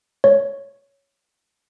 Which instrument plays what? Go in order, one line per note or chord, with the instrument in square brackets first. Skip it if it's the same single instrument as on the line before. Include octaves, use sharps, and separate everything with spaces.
[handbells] C#5